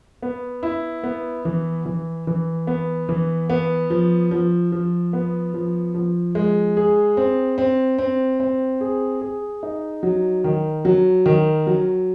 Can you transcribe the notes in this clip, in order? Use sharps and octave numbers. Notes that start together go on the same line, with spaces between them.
B3
E4
B3
E3
E3
E3
B3
E3
B3
F3
F3
F3
B3
F3
F3
G#3
G#4
C4
C4
C4
C4
G#4
G#4
D#4
F#3
D#3
F#3
D#3
F#3